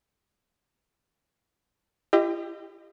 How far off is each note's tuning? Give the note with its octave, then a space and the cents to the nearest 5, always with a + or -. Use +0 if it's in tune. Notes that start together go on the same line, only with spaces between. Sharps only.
E4 +45 G4 +15 D#5 -10